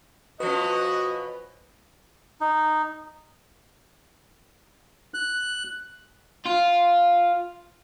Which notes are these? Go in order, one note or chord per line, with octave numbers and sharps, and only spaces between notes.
B2 F3 C#4 F#4 B4 D#5
D#4
F#6
F4